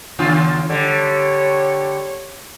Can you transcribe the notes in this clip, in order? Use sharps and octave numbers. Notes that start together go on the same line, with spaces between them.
D#2 C#3 F4
D3 G3 C#5